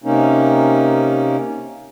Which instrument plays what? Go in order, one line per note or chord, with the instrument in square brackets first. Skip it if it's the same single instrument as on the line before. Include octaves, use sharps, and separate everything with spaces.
[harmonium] C3 A#3 C#4 D#4